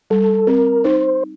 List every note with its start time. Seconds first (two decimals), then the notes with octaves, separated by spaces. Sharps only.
0.10 G3 A4
0.47 C4 A#4
0.84 D#4 C5